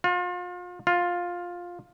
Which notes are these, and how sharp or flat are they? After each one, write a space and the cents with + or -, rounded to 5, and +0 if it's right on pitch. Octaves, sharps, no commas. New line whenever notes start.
F4 +35
F4 +10